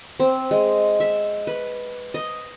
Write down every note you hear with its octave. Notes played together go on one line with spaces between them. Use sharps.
C4
G#3
E5
B4
D#5